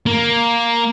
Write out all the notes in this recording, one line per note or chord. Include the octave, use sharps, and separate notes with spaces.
A#3